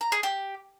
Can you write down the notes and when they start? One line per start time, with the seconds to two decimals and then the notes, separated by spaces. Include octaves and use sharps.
0.01 A#5
0.12 G#4
0.23 G4